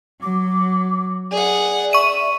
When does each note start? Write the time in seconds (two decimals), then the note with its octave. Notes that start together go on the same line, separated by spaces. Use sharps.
0.22 F#3 D6
1.32 G#4 D5 F#5
1.93 E5 C#6 D#7